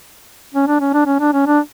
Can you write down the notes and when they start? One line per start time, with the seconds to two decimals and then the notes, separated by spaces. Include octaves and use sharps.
0.54 C#4
0.67 D4
0.80 C#4
0.94 D4
1.06 C#4
1.20 D4
1.33 C#4
1.46 D4